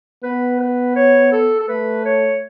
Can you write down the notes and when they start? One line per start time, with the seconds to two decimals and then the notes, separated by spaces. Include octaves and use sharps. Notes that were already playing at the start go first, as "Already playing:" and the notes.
0.23 B3 B4
0.60 B4
0.96 C#5
1.32 A4
1.60 A4
1.68 A3 B4
2.05 C#5